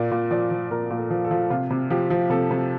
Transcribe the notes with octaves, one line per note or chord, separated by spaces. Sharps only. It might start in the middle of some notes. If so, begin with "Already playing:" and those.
Already playing: A#2 D5
A#2
F3 D5
F3
A#2 A#4
A#2
A4
F3
A4
F3
C3 F4
C3
F3 G4
F3
C3 A4
C3